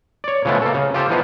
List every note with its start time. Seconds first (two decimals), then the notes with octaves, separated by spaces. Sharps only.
0.24 C#5 D5
0.45 C#3 F3 G#3 A3 B3
0.62 A#3 A4
0.74 C#3
0.94 F4 G4 A4 C5
1.10 E3 F3 B3 D#4 F4